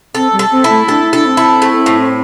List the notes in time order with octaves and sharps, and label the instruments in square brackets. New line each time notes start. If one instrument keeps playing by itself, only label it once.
[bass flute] C4 [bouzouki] A4
[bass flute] G3
[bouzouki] A4
[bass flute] C4
[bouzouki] E4
[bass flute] A3
[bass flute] D4 [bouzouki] A4
[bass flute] D4 [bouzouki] A4
[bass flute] C4
[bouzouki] E4
A3
A2